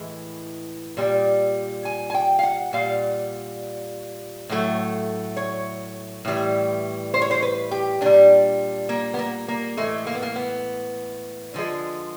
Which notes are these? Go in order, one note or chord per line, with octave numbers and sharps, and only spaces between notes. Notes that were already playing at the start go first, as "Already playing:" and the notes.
Already playing: A2 E3 G#3
A#2 G3
G#5
G#5
G5
F5
F#5
A#2 G3 F5
A2 F#3 A3
C#5
A2 E3 G3
C5
C#5
C5
B4
G4
A#2 G3 D4
A#3
B3
A#3
A#3
A2 E3 G#3 A3
A#3
B3
A#3
B3
D3 F3 G#3